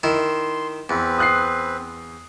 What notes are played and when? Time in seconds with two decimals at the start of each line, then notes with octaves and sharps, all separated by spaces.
0.03 D#3 E4 C6
0.89 E2 C4 B4
1.18 D#6 F#6 C7